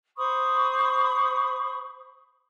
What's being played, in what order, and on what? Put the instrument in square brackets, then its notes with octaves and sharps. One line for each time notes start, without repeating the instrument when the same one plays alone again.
[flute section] C5 B5 C#6 D#6